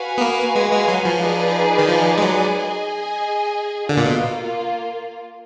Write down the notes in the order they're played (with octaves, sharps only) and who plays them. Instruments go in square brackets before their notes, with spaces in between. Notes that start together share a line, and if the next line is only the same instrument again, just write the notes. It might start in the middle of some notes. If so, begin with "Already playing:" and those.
Already playing: [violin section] F#4 B4 F5 G#5
[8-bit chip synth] B3
A#3
G#3
G#3
F#3
F3
[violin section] D#4 G#4 B4 D5
[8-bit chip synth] D#3
F3
G#3
F#3
[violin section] G#4 D#5 G#5
[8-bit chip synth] D3 [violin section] A#3 F4
[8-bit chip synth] A#2
B2